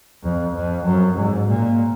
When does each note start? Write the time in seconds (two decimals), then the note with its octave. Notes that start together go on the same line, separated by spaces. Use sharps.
0.23 F2
0.54 F2
0.85 F#2
1.16 G#2
1.48 A#2